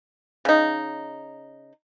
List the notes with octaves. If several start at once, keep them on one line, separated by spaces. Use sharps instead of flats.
C#3 D#4